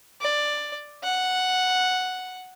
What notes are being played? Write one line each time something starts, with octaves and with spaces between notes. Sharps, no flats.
D5
F#5